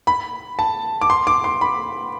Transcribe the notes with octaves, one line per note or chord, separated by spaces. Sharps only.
B5
A5
D6
C6
D6
C6
B5